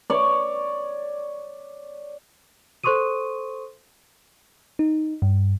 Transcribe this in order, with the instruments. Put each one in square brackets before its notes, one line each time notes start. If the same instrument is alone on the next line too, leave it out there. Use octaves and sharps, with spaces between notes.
[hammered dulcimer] C#5 D5
[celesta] A4 C5 C6 C#6 D#6 D#7
[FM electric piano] D#4
G2